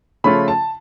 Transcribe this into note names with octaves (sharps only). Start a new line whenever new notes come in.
C#3 F3 A3 C#4 F4 B5
A5